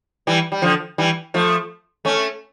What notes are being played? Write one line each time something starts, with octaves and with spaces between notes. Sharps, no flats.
E3 G3
G3
D3 F3
E3 G3
F3 A3
A3 C#4